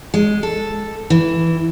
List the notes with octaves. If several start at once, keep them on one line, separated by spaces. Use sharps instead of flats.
G#3
A4
E3